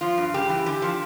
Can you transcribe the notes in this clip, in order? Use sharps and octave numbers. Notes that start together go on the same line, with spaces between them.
F3 F4
G2
C#3 G4
E3
D3 G4
F3